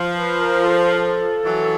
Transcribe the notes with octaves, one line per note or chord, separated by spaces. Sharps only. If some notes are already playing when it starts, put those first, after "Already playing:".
Already playing: F3
B4
A#4
A4
E3 F#3